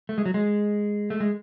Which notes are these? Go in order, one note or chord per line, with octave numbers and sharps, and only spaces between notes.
A3
G#3
F#3
G#3
A3
G#3